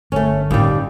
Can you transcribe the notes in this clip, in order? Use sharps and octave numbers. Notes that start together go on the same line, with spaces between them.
G1 A3 C#4
D#2 A2 G3 C#4